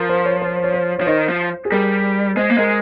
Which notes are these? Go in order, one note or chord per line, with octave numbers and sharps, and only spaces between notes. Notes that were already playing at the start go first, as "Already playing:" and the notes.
Already playing: F3 A#4
C5
C#5
C5
C#5
C5
F3 C#5
D#3 C5
F3
G#4
G3 A#4
G#3 C5
A#3
G#3 A#4